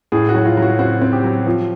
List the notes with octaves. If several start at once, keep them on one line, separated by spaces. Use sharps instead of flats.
A2 G#4
F#4
F#3
F4
F#3
F#4
C4 F#4
C4
G4
F#3
F3